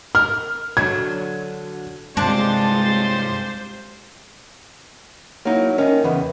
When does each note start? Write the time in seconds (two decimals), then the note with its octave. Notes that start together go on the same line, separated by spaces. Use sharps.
0.15 A#4 F6
0.77 D3 F#3 G#6
2.17 G2 C3 G#3 D4 F4 G4 C5 A6
5.45 F#3 A#3 D#4 E4
5.78 D#3 C#4 D#4
6.04 E2 C#3 B3